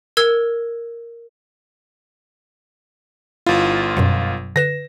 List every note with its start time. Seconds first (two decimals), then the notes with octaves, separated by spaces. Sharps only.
0.17 A#4 E6 G#6
3.47 G1 E4 F4
3.97 F#2 B2 F#3
4.56 D3 B4 A#6 E7